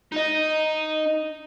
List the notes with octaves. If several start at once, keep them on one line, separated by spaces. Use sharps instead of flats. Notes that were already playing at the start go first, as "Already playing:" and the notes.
D#4 D#5